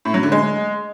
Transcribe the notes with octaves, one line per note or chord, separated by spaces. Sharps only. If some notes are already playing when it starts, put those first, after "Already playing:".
A2
F#3
D3
G#3